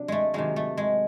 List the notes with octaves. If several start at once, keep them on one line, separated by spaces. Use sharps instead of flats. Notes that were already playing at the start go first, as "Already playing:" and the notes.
Already playing: C3 F#3 D4
G#3 A3
C3 D#3 F#3 G#3
A3
G#3